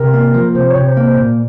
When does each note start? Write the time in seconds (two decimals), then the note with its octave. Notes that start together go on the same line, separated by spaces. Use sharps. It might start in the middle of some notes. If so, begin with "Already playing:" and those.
Already playing: C3 A#4
0.14 A#3
0.34 F3
0.55 C3 C5
0.71 C#5
0.76 C3
0.86 C5
0.97 A#3
1.02 C5
1.17 A#2